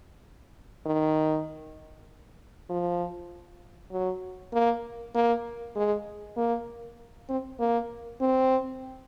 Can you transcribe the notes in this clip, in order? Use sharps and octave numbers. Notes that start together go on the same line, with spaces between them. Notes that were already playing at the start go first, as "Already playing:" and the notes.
D#3
F3
F#3
A#3
A#3
G#3
A#3
C4
A#3
C4